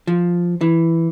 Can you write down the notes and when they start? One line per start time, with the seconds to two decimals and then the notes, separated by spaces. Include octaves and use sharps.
0.07 F3
0.61 E3